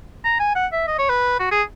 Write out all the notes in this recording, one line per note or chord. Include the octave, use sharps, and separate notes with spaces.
A#5
G#5
F#5
E5
D#5
C#5
B4
F#4
G#4